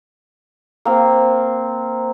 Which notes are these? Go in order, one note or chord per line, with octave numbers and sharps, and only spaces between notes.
A#3 C4